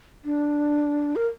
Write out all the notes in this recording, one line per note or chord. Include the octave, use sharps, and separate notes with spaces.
D4
A#4